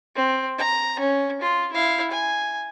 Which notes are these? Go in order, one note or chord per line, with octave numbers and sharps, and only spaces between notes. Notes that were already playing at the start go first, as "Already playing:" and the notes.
C4
A#5
C#4
F4
E4 F5
G#5